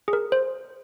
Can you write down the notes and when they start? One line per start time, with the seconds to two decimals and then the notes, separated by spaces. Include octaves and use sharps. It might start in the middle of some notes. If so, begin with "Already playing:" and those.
0.08 G#4
0.13 A#4
0.32 C5